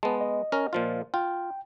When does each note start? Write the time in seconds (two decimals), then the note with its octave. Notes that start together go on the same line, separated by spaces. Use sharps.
0.03 G#3 B3 A5
0.21 D#5
0.52 C#4 A#4
0.73 A#2 F3 F4
1.14 F4 G5